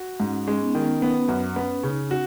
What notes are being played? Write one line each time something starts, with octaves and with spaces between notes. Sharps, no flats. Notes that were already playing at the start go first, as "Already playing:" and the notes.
Already playing: F#4
G#2 C#4
D#4
G#3 C#4
B3
D#3 C#4
B3
F#2
B3
C#3 D#4
F#4